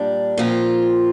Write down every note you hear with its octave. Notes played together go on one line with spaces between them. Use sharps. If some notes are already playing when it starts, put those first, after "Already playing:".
Already playing: A#2 G3 D4
A#2 F3 C4 F4